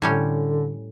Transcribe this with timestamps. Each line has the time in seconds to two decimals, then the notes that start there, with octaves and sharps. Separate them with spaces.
0.02 A2 D3 G3 C#4